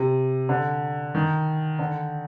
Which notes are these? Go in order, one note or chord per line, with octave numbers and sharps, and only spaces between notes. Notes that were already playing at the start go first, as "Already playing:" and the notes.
Already playing: C3
D3
D#3
D3